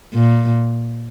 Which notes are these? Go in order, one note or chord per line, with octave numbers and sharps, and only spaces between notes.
A#2